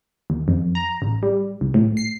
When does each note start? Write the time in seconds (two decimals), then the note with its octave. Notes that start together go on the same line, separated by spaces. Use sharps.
0.30 D#2
0.48 F2
0.75 A#5
1.02 A1
1.23 G3
1.61 C2
1.74 A2
1.97 C7